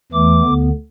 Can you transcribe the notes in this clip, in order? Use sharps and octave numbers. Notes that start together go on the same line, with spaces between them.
E2 E3 A3 D6
D2 D3 B3